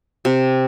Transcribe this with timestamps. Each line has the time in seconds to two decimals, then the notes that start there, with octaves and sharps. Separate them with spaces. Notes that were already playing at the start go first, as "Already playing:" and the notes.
0.25 C3